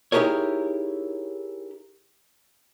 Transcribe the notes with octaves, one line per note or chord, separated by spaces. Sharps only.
D#4 E4 G4 G#4 A#4 C#5